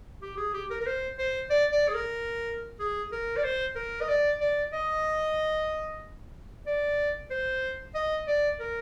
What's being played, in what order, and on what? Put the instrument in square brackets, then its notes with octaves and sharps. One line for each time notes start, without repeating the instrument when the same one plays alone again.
[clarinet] G4
G#4
G4
A#4
A#4
C5
C5
D5
D5
G#4
A#4
G#4
A#4
D5
C5
A#4
D#5
D5
D5
D#5
D5
C5
D#5
D5
A#4